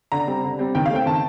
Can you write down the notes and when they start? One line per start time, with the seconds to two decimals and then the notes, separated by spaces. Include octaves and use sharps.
0.12 D3 A#5
0.28 G3 C4
0.44 D3
0.59 G3 C4
0.75 D#3 G5
0.86 F5
0.91 A3 C4 G5
1.06 D#3 A5